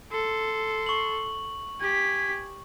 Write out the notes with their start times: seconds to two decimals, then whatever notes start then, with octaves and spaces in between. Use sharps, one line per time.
0.12 A4 C6
0.86 C#6 F#7
1.80 G4 G#5 B6